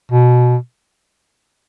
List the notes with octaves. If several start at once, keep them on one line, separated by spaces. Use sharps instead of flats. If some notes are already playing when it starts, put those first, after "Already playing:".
B2